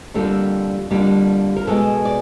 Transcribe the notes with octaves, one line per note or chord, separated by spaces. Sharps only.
F2 D3 G3 A#3 A4
F2 D3 G3 A#3
A#4
B2 G#3 A4
D5